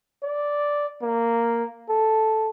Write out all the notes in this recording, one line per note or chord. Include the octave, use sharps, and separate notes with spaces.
D5
A#3
A4